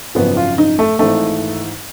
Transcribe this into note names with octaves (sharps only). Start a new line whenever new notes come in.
G#1 F#2 C#3 F3 B3
F4
D#4
A3
G#1 G#2 E3 A3